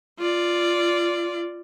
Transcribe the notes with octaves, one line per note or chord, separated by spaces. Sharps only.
F4 D5